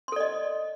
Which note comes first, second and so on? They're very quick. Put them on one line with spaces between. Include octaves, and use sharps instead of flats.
C6 A4 D5 D#5